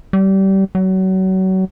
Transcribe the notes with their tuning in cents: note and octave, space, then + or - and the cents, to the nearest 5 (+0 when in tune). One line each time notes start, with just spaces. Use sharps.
G3 -25
F#3 +30